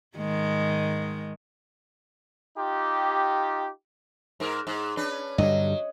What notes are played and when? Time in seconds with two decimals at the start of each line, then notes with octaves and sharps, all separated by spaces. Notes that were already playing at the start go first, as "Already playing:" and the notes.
0.18 G#2 D#3 G#3
2.57 D#4 F4 G4
4.40 G#2 A#4
4.67 G#2
4.97 C#4 D4 B4
5.38 G2 D3 F#3 G3 D#5